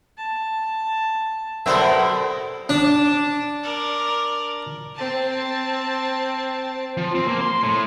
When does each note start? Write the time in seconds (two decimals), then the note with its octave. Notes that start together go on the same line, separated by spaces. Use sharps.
0.18 A5
1.66 F#3 B3 A4 A#4 C5 E5
2.69 D4 D6 E7
3.63 A#4 D5
4.95 C4 A5
6.97 F3
7.15 C4
7.27 A#3
7.41 C6
7.63 A2